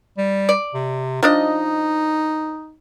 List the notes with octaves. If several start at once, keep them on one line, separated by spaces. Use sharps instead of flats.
G3
D5
C3
F3 D4 D#4 D#5